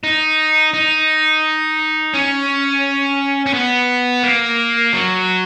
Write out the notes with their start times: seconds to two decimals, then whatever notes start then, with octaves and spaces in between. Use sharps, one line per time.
0.04 D#4
0.74 D#4
2.14 C#4
3.46 C#4
3.54 B3
4.23 A#3
4.93 F#3